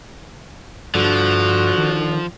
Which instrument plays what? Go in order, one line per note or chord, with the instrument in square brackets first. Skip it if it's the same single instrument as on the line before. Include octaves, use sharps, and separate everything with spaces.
[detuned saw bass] G2 [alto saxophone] D3 [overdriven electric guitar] F3 [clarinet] F#4
[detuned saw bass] D#3